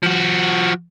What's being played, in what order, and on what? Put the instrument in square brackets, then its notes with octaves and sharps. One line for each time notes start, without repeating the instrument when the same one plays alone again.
[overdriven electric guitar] F3 F#4